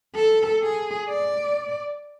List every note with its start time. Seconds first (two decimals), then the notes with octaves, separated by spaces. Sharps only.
0.16 A4
0.63 G#4
1.09 D5